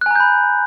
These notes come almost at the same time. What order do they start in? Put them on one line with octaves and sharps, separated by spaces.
F#6 G#5 A#5 G6 B5